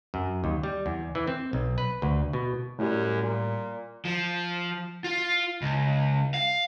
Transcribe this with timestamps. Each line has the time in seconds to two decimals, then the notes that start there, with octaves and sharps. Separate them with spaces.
0.14 F#2
0.44 D#2
0.63 G3
0.86 E2
1.15 E3
1.27 C4
1.53 B1
1.78 B4
2.02 D2
2.33 B2
2.79 F#2 A2 G3
3.22 A#2
4.05 F3
5.04 F4
5.62 C#2
6.34 F5